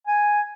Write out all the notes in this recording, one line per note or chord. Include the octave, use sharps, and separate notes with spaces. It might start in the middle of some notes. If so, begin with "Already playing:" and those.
G#5